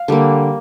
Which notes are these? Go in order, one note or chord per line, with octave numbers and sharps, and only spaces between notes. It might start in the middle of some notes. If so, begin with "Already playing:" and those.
Already playing: F5
D3 G3 A#3